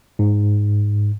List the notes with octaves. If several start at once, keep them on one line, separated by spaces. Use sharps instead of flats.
G#2